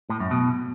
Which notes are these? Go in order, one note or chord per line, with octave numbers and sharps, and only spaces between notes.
A2
F#2
B2